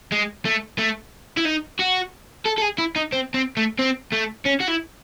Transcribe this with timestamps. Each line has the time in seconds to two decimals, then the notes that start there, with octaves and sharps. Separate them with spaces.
0.12 G#3
0.45 A3
0.79 A3
1.37 E4
1.45 D#4
1.79 F#4
2.45 A4
2.58 A4
2.62 G#4
2.78 E4
2.96 D#4
3.13 C4
3.34 C4
3.57 A3
3.79 C4
4.12 A3
4.45 C#4
4.60 F#4
4.68 E4